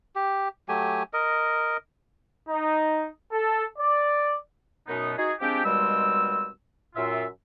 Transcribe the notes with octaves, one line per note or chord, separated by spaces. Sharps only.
G4
F#3 A3 G4 G#5
A#4 D#5
D#4
A4
D5
F#2 B2 B3 D#4
D#4 F#4 G#4
F3 G#3 C4 D4 G4
D#2 B2 G3 G#3 C4 E6
F#2 A#2 F4 E5